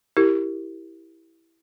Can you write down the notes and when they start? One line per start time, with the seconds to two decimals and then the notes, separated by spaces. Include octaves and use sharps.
0.17 E4 G4 A#4